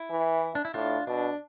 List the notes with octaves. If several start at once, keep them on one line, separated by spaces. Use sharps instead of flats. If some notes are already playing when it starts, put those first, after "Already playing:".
Already playing: E4
E3
D4
E4
A2 D4 F4
B2 D4